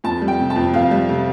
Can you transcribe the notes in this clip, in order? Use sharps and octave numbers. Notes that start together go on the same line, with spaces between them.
F2 A5
G3
G5
C3
A5
F2
F2 F5
G3
C3